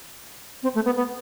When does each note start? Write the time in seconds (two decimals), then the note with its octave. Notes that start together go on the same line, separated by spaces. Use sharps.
0.63 C4
0.75 A3
0.85 B3
0.97 B3